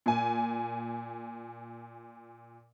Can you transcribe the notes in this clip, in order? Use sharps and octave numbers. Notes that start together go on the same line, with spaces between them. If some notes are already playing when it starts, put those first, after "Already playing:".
A#2 G#5